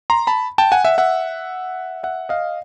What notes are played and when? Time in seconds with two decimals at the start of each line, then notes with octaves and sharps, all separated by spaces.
0.10 A#5 C6
0.27 A5 B5
0.58 G5 A5
0.72 F#5 G#5
0.84 E5 F#5
0.98 E5 F#5
2.03 E5 F#5
2.29 D#5 F5